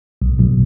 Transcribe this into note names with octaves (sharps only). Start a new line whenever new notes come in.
B1
B1